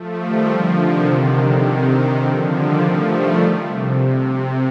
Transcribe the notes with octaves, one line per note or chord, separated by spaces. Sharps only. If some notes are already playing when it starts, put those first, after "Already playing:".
Already playing: F3 A3
D#3 G3
D3 F3
C3 D#3
D3
C3 D#3
D3 F3
D#3 G3
F3 A3
D#3 G3
C3
C3